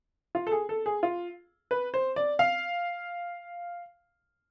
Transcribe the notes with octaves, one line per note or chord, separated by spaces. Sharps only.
F4
A4
G#4
A4
G#4
F4
B4
C5
D5
F5